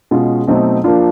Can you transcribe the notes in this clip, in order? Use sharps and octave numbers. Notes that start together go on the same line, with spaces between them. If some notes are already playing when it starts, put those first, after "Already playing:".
B2 G#3 C#4 F4
B2 F#3 A3 C4 D#4
F3 A#3 D4 F4